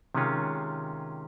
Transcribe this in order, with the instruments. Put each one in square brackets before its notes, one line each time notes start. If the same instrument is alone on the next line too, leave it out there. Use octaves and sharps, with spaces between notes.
[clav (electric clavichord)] C3 D#3 G#3 C#4 F4